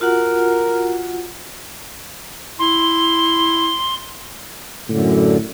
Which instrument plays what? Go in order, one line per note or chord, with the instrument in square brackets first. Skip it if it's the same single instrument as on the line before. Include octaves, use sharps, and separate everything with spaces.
[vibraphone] F4 F#4 F#5 [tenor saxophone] A#4
[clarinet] E4 [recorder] C6
[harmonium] F#2 D3 [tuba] A2